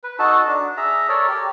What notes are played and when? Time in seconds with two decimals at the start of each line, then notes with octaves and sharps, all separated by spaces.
0.04 B4
0.19 D#4 F#4 A4 A5
0.47 D4
0.77 G#4 E5 A#5
1.09 A4 A#4 C#5 D5
1.28 G4